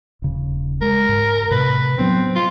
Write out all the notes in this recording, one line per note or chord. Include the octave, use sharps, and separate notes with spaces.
D#1 C#3
G#3 A#4
G#2
A2 C3 B4
F#3 B3 C4 D4
F4